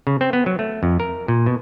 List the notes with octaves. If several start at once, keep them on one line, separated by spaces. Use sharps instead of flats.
C#3
C4
B3
F#3
A3
F2
A#4
A#2
B2